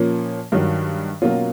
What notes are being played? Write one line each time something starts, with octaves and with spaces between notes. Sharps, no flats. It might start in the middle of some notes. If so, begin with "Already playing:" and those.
Already playing: A#2 F3 A#3 C#4
G2 D#3 F#3
B2 F#3 A#3 C#4 F4